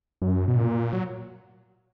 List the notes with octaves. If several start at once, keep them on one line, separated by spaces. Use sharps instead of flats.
F#2
B2
A#2
F#3